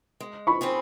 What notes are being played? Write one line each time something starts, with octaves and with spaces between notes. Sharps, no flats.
G#3
B5 C#6
C4 F4 G#4